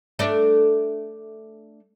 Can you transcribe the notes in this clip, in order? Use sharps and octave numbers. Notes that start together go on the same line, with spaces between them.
A3 D4